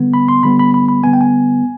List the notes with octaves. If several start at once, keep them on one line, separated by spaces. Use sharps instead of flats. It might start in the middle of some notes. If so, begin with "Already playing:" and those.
Already playing: D3 G3 B3
B5
C6
D3 G3 B3 B5
B5
B5
B5
D3 G3 B3 G#5
G5
G#5